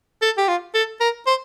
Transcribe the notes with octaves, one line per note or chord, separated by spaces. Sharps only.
A4
G4
F4
A4
A#4
C5